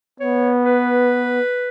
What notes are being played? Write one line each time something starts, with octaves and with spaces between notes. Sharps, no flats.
B3 C#5
B4